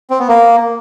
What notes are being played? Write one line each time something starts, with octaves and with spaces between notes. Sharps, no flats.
C4
B3
A#3